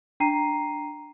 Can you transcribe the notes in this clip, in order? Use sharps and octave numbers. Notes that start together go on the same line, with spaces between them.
D4 G5 A#5 C7 D#7